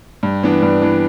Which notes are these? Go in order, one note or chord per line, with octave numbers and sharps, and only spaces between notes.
G2
E3 B3 D4
G2
E3 B3 D4